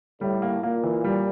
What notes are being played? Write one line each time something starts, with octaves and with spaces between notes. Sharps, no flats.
A2 G3
A#3
A#2 A#3
E3
G3